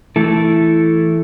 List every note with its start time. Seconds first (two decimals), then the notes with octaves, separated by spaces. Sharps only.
0.16 E3 A3 E4 A4